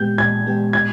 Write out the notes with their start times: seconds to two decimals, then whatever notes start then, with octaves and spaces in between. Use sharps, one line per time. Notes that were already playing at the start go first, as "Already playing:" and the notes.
Already playing: A#2 G#3 B3 G4 G6
0.18 A#2 G#6
0.46 G#3 B3 G4
0.73 G#6